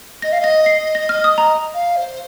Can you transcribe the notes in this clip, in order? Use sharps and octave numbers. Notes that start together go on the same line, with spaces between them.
D#5 A#6
F5
D#5 A#6
C7
A#6
D#5 F6
D#6
A#5
F5
C5